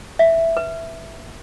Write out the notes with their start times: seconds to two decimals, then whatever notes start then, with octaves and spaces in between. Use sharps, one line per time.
0.19 E5
0.57 B4